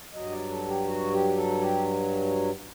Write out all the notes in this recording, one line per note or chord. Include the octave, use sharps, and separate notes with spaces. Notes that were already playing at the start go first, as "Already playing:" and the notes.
G2 F#3 D#5
D5
A4
G4
F#4
G4
A4
G4